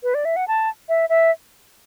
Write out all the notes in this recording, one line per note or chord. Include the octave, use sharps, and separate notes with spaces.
B4
D5
E5
F#5
A5
E5
E5